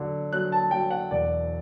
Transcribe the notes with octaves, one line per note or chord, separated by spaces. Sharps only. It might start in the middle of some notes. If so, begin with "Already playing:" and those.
Already playing: D3 F#3
F#3 F#6
A5
F#3 G5
F#5
E1 D5